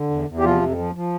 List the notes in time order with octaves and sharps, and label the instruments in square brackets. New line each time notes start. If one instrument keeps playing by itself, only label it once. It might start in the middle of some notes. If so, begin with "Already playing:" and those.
Already playing: [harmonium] D3
E2
E2
G4
C3 F3 F4
F2
F3
F3